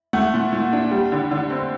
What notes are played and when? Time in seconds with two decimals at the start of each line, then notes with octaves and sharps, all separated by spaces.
0.13 A3 F#5
0.34 A#2
0.53 A#2
0.73 D4
0.91 G3
1.12 D3
1.31 D3
1.50 C4